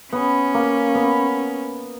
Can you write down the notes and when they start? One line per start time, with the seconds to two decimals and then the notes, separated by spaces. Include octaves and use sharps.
0.12 B3 C#4
0.54 A#3
0.95 B3